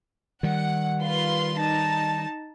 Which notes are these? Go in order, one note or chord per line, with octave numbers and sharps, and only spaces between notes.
D#3 G3 F#5
F4 B4 C6
D#4 A5